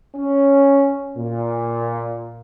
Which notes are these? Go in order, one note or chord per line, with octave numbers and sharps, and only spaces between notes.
C#4
A#2